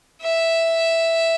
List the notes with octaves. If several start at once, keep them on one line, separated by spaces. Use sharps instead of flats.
E5